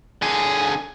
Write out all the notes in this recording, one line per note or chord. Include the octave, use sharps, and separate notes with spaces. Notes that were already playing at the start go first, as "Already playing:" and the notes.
D3 G#4